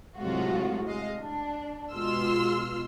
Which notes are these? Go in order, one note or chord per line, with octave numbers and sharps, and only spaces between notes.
A2 C3 F#3 G#3 F4 F#4
G#3 D#5 F5
D4
B2 G#3 F4 C6 E6 F6